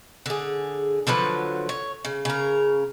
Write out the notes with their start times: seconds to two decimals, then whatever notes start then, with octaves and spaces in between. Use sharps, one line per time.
0.26 D3 G#4
1.07 D3 F3 F#3 B4
1.69 C#5
2.05 C#3
2.25 C#3 A#4